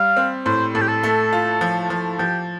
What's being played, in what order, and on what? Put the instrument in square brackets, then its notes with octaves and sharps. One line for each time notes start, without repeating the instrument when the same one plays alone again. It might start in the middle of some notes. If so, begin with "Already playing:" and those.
Already playing: [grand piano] G3 [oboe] F5
[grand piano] C4
[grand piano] A2 [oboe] C5
[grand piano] A2 [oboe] A4
[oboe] G4
A4
[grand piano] A3
F4
F3
F3
[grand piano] F3 [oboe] G4